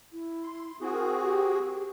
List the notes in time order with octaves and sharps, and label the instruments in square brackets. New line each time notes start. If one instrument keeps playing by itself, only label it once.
[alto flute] E4
[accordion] C6
[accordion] C4 F#4 G#4 [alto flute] E4
[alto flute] A#4
G4